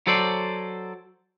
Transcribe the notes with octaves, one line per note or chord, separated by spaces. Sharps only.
F#3 A4 C5 D5